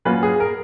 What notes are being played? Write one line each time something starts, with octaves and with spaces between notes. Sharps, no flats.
A#2 F#3 C#4 F4 B4
G#4
A#4